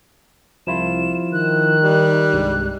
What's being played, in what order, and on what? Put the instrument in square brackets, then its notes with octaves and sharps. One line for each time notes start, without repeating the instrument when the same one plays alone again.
[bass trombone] C2 [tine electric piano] F3 E4 F4 [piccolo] E7
[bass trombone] D#3 [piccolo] F#6
[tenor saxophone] G3
[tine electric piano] C2 G2 G#3